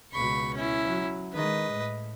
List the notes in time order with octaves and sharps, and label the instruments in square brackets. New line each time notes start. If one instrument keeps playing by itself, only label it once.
[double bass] C#2 B2 [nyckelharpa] B5 C#6
[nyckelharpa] C#4 E4
[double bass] F#3
[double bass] D#3 G#3 [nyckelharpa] B4 D#5
[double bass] A2